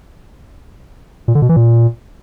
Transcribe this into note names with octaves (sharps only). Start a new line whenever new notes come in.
A#2
D3
B2
E3
A#2